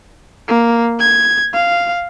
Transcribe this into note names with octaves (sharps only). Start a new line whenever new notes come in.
A#3
G#6
F5